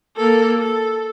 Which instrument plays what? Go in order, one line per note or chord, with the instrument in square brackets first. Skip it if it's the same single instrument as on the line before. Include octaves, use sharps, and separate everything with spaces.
[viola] A#3 A4
A4